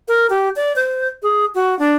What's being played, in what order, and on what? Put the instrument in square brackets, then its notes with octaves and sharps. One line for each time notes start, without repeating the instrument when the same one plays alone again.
[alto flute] A#4
G4
D5
C5
G#4
F#4
D4